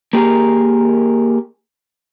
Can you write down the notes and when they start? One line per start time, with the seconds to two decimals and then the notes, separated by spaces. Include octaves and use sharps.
0.13 A#3 G4 G#4 A#4